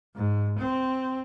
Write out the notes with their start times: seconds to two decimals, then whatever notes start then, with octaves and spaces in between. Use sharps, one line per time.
0.15 G#2
0.58 C4